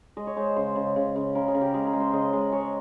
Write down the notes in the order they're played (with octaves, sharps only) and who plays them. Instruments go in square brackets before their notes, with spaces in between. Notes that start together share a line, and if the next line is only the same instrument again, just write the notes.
[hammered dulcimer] G#3 D#5
C#5
G#3 C5
C#3 C5
C#3
C#3
C#3
C#3 A#4
G#4
C#3
G4
G#3 G#4
A#4
G#3
C5
C#3 D#5
G#3
G#3 C#5